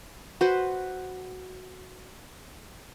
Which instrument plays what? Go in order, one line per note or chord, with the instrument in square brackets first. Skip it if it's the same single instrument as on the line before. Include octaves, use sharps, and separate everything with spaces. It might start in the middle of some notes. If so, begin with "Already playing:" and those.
[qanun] F#4 B4 C5